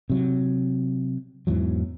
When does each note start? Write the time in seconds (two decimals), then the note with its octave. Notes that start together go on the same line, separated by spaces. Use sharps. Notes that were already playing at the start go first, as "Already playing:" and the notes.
0.10 C3 F#3
1.47 E2 G#2 E3 F#3